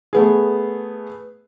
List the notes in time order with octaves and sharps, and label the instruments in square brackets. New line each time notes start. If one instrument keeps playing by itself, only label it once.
[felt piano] A3 B3 G#4